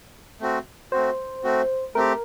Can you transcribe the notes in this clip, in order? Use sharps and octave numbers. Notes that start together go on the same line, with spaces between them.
A3 C4 F#4
A3 C4 F#4 C5
A3 C4 F#4
A3 C4 G4 A#4